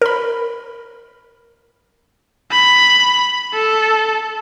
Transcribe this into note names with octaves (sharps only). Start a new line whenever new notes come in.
A#4 B5
B5
A4